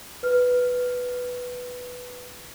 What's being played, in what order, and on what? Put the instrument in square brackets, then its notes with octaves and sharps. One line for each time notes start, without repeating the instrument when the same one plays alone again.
[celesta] B4 F6